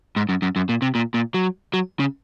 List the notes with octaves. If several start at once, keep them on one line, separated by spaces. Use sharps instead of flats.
G#2
F#2
F#2
F#2
A#2
C3
A#2
A#2
F#3
F#3
C#3